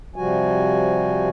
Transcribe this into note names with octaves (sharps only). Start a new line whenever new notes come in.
C3 F3 G3 F#4 G#5